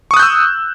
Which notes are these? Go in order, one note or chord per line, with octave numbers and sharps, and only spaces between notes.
C#6 D#6 E6 F#6 G6